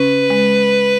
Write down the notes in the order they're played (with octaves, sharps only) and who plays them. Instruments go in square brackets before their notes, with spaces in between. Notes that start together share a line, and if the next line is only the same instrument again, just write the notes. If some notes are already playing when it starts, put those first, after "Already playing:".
Already playing: [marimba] C#3 C#4 [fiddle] B4
[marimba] G#3